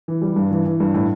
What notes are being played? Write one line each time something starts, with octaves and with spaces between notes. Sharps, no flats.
E3
G3
G2
E3
E3
G2
A2